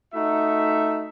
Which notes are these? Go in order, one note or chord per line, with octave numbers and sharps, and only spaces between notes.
A3 D#4 F#4 E5